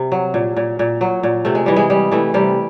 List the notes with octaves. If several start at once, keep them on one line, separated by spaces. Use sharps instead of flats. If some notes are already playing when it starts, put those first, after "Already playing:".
Already playing: C3 G3
F#3
A#2
A#2
A#2
F#3
A#2
C3 A3
G#3
E3 G3
G#3
G3
E3 A3
C3 G3